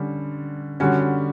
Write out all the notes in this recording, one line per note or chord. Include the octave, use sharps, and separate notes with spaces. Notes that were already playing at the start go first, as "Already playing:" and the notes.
Already playing: D3 G3 C#4
D3 G3 C#4 F#4